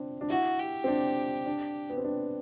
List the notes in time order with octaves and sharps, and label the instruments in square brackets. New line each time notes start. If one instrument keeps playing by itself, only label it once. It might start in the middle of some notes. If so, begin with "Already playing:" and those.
Already playing: [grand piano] C4 D4
D4
[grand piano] E4 [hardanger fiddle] F#4
[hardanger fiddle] G4
[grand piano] C4
D4
D4
B3
C4
D4